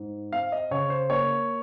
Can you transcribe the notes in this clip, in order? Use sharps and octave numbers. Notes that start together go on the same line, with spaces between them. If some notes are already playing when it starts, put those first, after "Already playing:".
Already playing: G#2
C4 F5
D#5
C#3 C#5
C5
A#3 C#5